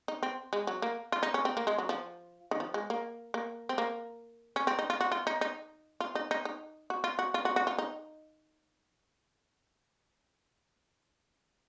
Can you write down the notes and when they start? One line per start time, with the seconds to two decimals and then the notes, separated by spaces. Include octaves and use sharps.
0.08 D#4
0.23 C4
0.53 G#3
0.67 F#3
0.82 A#3
1.12 F4
1.23 D#4
1.34 C#4
1.45 C4
1.57 A#3
1.67 G#3
1.78 F#3
1.89 F3
2.51 D#3
2.60 F3
2.74 G#3
2.90 A#3
3.34 A#3
3.69 C4
3.78 A#3
4.56 C#4
4.67 C4
4.79 D#4
4.90 F4
5.01 F#4
5.12 F4
5.27 D#4
5.41 D#4
6.00 F4
6.15 D#4
6.31 D#4
6.45 D#4
6.90 F#4
7.04 F4
7.19 F#4
7.34 F4
7.45 F#4
7.56 F#4
7.67 F4
7.78 D#4